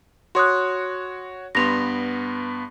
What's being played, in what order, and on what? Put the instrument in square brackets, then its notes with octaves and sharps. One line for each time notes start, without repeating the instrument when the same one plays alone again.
[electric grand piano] F#4 C#5 [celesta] C6 D#6 F#6
[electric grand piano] G2 B3 C6 [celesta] A#6 F7